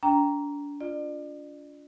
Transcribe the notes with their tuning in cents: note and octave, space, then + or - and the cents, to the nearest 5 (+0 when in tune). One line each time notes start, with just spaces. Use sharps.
D4 -30 G5 +0 A#5 +0
F4 +0 D5 +40